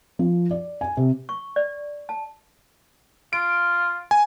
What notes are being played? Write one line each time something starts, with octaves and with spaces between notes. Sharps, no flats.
F3
D5
G#5
C3
C#6
D5
A5
F4 D7
G#5